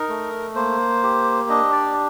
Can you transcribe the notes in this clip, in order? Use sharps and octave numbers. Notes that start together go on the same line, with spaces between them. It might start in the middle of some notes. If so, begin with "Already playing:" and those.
Already playing: D#4 A#4
A3
A#3 C5
G4
D4 D#5
D5